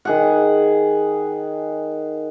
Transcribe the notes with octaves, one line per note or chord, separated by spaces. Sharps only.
D#3 G#4 F#5